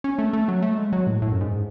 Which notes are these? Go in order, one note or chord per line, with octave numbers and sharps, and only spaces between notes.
C#4
A3
A3
F#3
A3
G#3
F#3
A2
A2
F#2
G#2